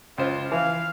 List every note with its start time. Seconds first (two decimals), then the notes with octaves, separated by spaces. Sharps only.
0.18 C#2 F4 C5
0.52 E3 F5